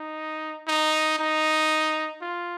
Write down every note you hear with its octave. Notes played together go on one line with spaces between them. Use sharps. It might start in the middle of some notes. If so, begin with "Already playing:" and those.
Already playing: D#4
D#4
D#4
F4